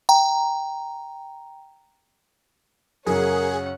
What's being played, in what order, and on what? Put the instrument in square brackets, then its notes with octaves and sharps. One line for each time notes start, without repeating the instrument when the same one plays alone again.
[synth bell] G5 A#5
[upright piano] F#2 C#3 [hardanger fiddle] C#4 F#5 [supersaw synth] G#4 [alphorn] A#4